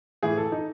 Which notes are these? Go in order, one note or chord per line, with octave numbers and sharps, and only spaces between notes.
A2 E3 G#4
A4
D#4